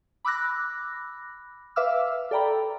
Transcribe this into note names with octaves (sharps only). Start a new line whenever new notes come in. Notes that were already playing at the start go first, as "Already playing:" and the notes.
B5 D6 E6 F#6 A#6
B4 E5 F5 D6 E6 F6
A4 D5 G5 A#5 B5